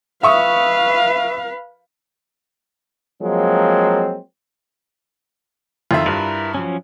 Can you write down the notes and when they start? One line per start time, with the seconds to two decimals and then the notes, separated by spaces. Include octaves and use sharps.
0.23 B4 E5 F5 C#6 D#6
3.22 F3 F#3 G#3 A#3 C4
5.91 F2 D#3 F4 E5
6.06 G2 E4 A#4 B4
6.55 F3 F#3 C#4